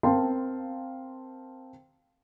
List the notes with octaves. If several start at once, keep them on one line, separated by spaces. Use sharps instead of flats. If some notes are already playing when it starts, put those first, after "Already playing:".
C4 A#4 F5 G5 A5 C6